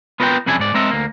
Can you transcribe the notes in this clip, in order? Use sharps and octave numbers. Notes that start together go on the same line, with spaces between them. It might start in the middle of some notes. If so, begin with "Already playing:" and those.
B3 F4 A#4 B4 D#5 G5
C2 F2 C#3 D4 E4 G#5
G#2 D5
G#3 C4 D4 A#4 D#5 E5
D2 A#3